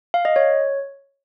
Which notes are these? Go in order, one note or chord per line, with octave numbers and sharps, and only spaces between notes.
F5
D#5
C#5